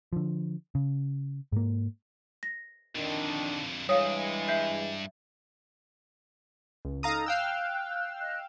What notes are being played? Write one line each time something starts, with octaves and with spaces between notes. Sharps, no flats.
D3 F3
C#3
G#2 A#3
A#6
F2 D3 D#3 D4
G2 E3 G#3 C#5 F5 D#6
E5 G6 C7
C#2
D#4 A4 F5 A#5 D#6
F5 G5 E6 F#6
D#5 F#6